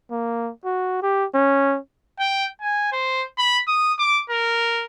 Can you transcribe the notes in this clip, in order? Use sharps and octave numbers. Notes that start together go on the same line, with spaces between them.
A#3
F#4
G4
C#4
G5
G#5
C5
B5
D#6
D6
A#4